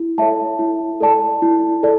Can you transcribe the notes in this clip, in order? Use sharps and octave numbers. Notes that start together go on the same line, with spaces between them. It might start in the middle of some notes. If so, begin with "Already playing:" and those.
Already playing: E4
A4 C#5 E5 A5
E4
A4 D5 A5
E4
A4 D5 A5